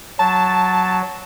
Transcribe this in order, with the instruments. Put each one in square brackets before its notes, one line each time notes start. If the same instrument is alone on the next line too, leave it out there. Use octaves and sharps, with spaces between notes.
[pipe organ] F#3 [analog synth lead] A5